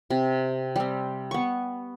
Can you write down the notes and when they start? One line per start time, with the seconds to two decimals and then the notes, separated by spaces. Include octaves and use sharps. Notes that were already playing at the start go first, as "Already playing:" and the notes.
0.10 C3
0.76 G3 C4
1.31 B3 C#6